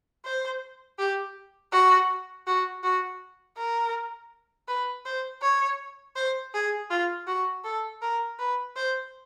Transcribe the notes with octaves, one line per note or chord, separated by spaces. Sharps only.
C5
G4
F#4
F#4
F#4
A#4
B4
C5
C#5
C5
G#4
F4
F#4
A4
A#4
B4
C5